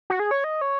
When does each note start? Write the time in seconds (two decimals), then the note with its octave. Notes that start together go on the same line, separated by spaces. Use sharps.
0.10 F#4
0.19 G#4
0.31 C#5
0.44 D#5
0.61 C#5